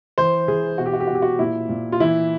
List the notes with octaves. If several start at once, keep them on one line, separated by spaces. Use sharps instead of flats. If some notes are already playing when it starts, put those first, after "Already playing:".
E3 C5
E3 G#4
B2 F#4
G4
F#4
G4
B2 F#4
G4
F#4
A#2 E4
A#2
F4
E3 E4